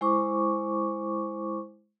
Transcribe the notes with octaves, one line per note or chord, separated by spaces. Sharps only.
G#3 E4 C5 C#6 D6